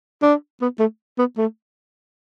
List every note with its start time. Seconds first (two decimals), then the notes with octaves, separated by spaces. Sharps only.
0.22 D4
0.62 B3
0.80 A3
1.18 B3
1.37 A3